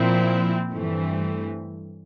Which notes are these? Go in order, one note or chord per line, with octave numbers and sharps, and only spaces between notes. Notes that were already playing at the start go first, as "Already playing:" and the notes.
Already playing: A#2 F3 C4 E4
G2 E3 A3 C4